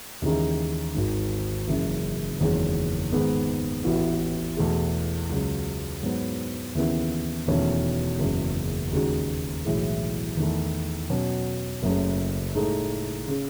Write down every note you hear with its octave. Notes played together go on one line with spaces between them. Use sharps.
D#2 C#3 E3 G#3 D#4
G#1 G#2 D#3
F#1 F#2 C#3 E3 G#3
F#1 E2 D#3 G#3 C#4
G#2 D#3 G#3 B3
A1 A2 E3 B3 F#4
E2 B2 A3 E4 G#4
C#2 C#3 F#3
G#2 F#3 B3
D#2 C#3 E3 B3 E4
E1 E2 D#3 A3 C#4
F#1 E2 C#3 G#3
D#2 C#3 G#3 D#4 F#4
B1 A2 E3 G#3
E2 D#3 A3 E4
B2 F#3 C#4
F#1 F#2 C#3 F#3 A3
A2 G#3 D#4 A4
C#3